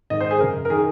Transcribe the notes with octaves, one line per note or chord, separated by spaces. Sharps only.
G#2 D#3 D#5
C5
G#4
F#2 C#3 A#4
A#4
D#3 G#4